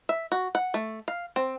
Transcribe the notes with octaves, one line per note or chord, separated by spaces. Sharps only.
E5
F#4
F#5
A3
F5
C4